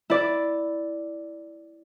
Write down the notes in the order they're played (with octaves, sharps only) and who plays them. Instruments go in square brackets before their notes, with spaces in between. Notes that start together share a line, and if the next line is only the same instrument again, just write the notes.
[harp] E4 D5